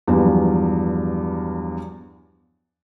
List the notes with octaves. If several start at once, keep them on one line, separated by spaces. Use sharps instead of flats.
E2 G2 F3 F#3